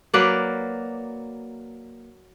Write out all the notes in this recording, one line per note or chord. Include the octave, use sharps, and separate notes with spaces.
F#3 A#3 B4 D5